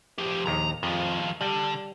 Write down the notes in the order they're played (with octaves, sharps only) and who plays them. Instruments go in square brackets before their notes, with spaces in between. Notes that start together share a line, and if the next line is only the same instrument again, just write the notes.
[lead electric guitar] F3 G4
[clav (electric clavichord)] A#1 D#2 D#3 [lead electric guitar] A#5
[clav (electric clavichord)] F2 [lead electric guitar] D#3 F3
[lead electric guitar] D3 [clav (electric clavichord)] G3